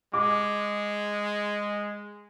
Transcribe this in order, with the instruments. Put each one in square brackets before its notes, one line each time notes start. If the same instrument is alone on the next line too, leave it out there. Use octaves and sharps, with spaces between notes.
[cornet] G#3 [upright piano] D6